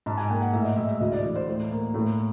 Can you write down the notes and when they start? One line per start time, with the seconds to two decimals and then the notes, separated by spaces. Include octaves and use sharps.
0.06 G#2 A5
0.17 G#5
0.30 A#3 G5
0.42 F#5
0.53 A2 E5
0.65 D#5
0.76 G#3 E5
0.89 E5
1.00 D2 D#5
1.12 D5
1.24 E3
1.36 C5
1.47 A2
1.71 A#3
1.94 A2